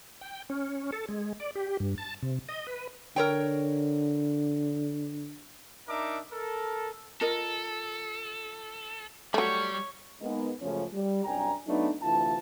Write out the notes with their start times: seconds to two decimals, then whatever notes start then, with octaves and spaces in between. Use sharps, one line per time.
0.21 G5
0.50 C#4
0.92 A4
1.09 G#3
1.40 D5
1.55 G4
1.80 G2
1.98 A5
2.23 C3
2.49 D#5
2.67 B4
3.16 D3 A#4 C#5 G5
5.88 D4 D#4 A#4 E5 D6
6.31 A4 A#4
7.21 F4 A4 A#4 D#5
9.34 F#3 G3 A3 C#5 C#6
10.21 G#3 A#3 B3 D#4
10.62 C#2 F#2 C#3 F3 A3 C#4
10.93 G3
11.25 C2 F#2 D4 G5 G#5 A#5
11.67 F#3 A3 B3 D4 D#4
12.02 D2 C3 E3 E4 F4 A5